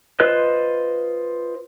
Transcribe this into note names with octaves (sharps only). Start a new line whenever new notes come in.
F4 B4 C5 D#5 F#6